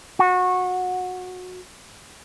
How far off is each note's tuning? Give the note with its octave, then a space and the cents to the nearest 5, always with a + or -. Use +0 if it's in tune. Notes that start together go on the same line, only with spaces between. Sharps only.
F#4 -20